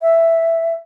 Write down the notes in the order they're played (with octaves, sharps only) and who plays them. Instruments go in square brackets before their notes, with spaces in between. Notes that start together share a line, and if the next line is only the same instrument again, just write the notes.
[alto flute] E5